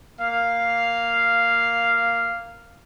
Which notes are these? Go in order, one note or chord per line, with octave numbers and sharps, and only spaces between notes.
A#3 F5